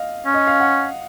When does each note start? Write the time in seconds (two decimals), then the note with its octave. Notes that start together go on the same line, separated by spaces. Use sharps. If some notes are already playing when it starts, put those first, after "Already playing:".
Already playing: D#5 F5
0.26 C#4
0.34 D#5
0.47 F5
0.60 F#5